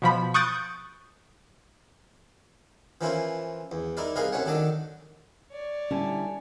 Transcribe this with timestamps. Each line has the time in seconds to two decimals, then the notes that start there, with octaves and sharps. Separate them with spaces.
0.02 B2 F3 B5
0.34 C#6 D#6 F#6 G6 A6 D7
3.01 E3 F3 A#3 C#4 E4 F4
3.72 E2
3.97 D#4 E4 A#4 D5
4.16 C2 G#4 A#4 B4 D#5 F5
4.32 C2 A3 C#4 C#5 F#5
4.46 D#3 F#3 D4 A4 D#5
5.51 C#5 D5
5.91 D3 G3 C#4 E4 G#5 A5